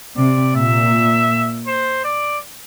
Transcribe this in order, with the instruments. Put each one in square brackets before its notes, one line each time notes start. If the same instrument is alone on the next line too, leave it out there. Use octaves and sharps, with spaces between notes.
[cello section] C3 [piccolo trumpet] D5
[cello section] A#2 [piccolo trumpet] E5
[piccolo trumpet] C5
D5